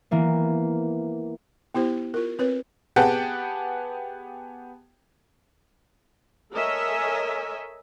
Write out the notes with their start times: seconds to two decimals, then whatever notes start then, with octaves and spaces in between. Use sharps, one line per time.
0.11 E3 A#3 B3
1.74 B3 E4 G4 C5
2.14 F4 A#4
2.39 C4 B4 C#5
2.96 B3 G4 G#4 F#5 G5 A5
6.53 A4 A#4 C#5 D#5 E5 G#5